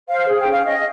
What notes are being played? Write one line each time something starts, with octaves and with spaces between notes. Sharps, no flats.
C5 F5
G#4
G5
C#4
F5
C#4 D#5